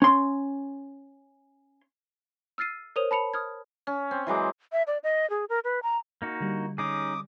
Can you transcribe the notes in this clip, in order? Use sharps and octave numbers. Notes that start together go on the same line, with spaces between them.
C#4 C6
E6 F6 A6 C7 D#7
A#4 C5 C#5 D#6 D#7 F7
A5 B5 C#7 F7
D#6 F6 G#6
C#4
C4
E3 F#3 G#3 D6
E5
D5
D#5
G#4
A#4
B4
A#5
A#3 D#4 F#4
D3 G3
C#4 D#4 G#4 D6 D#6